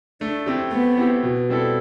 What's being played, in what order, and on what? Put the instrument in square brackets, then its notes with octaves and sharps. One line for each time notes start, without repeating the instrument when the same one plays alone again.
[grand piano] A3 [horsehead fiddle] D4
[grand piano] C4 E4 G4
[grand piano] A3 [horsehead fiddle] B3
[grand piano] C4 E4 G4
B2
G3 C4 E4 A4